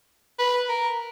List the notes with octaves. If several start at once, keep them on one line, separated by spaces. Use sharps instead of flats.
B4
A#4